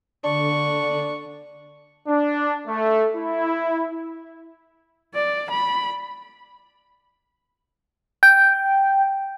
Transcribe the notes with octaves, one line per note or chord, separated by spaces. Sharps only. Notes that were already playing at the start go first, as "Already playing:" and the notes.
D3 D4 C#6
D4
A3
E4
D5
B5
G5